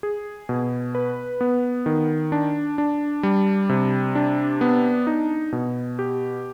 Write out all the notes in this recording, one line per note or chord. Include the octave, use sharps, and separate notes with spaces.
G#4
B2
B4
B3
D#3
D4
D4
G3
C3
D4
B3
D#4
B2
G4